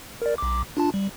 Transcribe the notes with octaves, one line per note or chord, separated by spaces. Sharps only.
A#4 D5
B1 D6
D4 F4 A5
G3